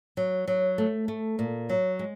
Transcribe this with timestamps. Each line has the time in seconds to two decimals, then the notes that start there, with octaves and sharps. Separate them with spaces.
0.17 F#3
0.48 F#3
0.78 A3
1.08 A3
1.39 A#2
1.69 F#3
1.99 G#3